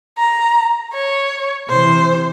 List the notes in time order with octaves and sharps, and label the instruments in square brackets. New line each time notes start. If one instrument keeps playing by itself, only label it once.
[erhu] A#5
C#5
[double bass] C3 E3 [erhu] C5